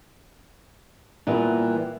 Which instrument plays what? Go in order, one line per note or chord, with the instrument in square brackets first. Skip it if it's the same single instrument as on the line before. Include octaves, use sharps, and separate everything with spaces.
[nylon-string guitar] A#2 E3 G3 B3